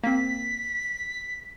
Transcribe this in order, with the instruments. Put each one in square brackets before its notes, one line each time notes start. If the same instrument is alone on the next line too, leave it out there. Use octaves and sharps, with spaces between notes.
[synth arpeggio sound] A#3 C4 [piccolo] B6